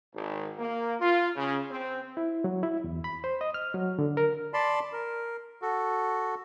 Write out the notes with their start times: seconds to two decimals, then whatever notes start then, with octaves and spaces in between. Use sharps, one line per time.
0.13 G#1
0.59 A#3
0.99 F4
1.36 C#3
1.71 C4
2.17 E4
2.44 F#3
2.63 E4
2.84 E2
3.04 B5
3.24 C5
3.41 D#5
3.54 F6
3.74 F#3
3.99 D3
4.17 A#4
4.54 D5 A5 B5 C6
4.93 A#4
5.62 F#4 A4